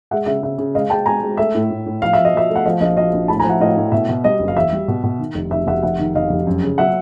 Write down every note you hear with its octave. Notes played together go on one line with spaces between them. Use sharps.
G#3 E5 F#5
C#3 E5
C#3 E5
C#3
G#3 D#5 F5
G#3 G5 A5
G#3 G#5 A#5
G#3
A3 E5
A2
A2
A2
F3 F5
F3 E5
D#5
F3 E5
A3
F#5
F3 D#5 F5
A#1 D#5 F5
F3 D#5 F5
A#1
A2 A5 B5
G#5 A#5
F3
E5 F#5
A2 D#5 F5
A2
B2 E5
B2
G3 D#5
F#1
F5
E2 E5
G3
B2
B2
D#3
F1
F1 E5
F1 E5 F#5
F1 E5 F#5
D#3
F1 D#5 F5
F1
F#2
C#3
F#3 E5 F#5